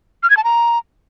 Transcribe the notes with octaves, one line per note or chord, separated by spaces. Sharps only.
F6
G#6
A5
A#5